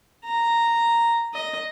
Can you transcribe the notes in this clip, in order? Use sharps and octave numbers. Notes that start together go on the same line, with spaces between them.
A#5
D#5